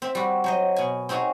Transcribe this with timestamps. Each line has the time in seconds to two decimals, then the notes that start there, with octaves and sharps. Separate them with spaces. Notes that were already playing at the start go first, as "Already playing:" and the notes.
0.02 C4 E5
0.15 G3 F#4
0.44 F#3 C5 D#5
0.76 B2 G#5
1.09 C4 D#4 F#4 G#4 C#5